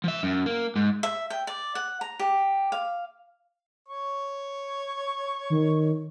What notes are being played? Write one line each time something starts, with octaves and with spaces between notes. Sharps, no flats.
F3 E5
F#2
A#3
G#2
E5
G5
D5
F#5
A#5
G4
F5
C#5 C#6
D#3